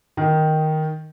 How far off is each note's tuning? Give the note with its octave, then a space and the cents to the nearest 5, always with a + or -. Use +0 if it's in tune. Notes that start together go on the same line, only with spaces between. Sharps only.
D#3 +0 D#4 +0